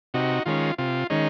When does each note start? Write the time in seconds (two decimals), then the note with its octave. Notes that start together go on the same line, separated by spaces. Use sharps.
0.14 C3 D#4 F#4
0.46 D#3 G#3 C#4 F4
0.78 C3 F4
1.10 D#3 G#3 C#4 D#4